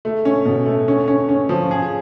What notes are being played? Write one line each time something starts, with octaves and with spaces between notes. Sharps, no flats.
A3
C#4
B2
A3
C#4
C#4
C#4
F3
G#4